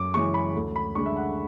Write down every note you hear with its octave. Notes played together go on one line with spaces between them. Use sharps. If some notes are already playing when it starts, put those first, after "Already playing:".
Already playing: F#2 D6
C#3 E3 G#3 C#4 C#6
B5
D2
B5
D3 G#3 D4 C#6
E5
F#5